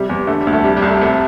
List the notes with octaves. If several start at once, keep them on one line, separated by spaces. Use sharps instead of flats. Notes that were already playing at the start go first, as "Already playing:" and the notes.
Already playing: C3 G3
E2
D3 A3
G3
D2
A3
C3 G3
G3
C2
A3
C3 A3